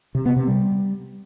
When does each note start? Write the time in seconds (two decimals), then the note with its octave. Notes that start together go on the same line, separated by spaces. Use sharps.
0.15 C3
0.26 B3
0.36 C3
0.47 G3